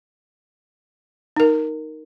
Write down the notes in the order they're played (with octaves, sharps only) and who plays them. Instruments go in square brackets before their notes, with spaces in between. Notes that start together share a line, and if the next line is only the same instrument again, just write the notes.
[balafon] D#4 A#4